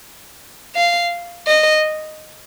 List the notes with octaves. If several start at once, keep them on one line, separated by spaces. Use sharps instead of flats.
F5
D#5